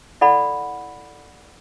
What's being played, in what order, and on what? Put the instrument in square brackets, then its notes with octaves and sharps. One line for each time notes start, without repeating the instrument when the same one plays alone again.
[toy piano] E4 A4 D5 F#5 B5